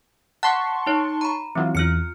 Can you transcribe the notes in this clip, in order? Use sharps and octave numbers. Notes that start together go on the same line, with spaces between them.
F#5 A5 C6 C#6 F#6
D#4 C#5
A#5 B5
E3 F#3 C4 F4
E2 F4 F6 C#7